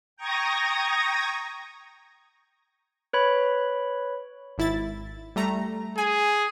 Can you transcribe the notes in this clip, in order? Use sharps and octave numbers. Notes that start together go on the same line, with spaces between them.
G5 A#5 C#6 D#6 G#6 A#6
B4 C#5 B5
G#1 E4 A6
G3 A3 A#5
G#4 G#5